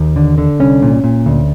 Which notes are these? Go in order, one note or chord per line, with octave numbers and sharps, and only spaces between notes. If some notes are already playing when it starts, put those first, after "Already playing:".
Already playing: D#2
D3
D3
C2 C#4
A#2
A#2
D2